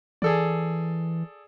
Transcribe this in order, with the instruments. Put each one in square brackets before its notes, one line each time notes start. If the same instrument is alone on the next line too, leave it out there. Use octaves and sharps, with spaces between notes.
[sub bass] E3 [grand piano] G#4 A4 D5